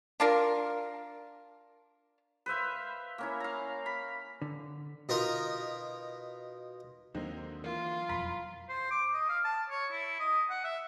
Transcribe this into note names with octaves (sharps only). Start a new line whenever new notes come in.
D4 F4 A#4
B4 C5 E5 F5
A#3 C#4 E4
F5 A#5
B5
D3
B2 D#4 F4 A#4 A#5
D#2 D3 F#3 A#3 C4 D#4
E3 A#3 F4
E1 F2 F#3 A#5 B5 B6
C5
D6
D#5
F5
A5
C#5
E4
D#5
F#5
E5